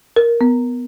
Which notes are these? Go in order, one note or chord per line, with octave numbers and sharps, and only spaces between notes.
A#4
B3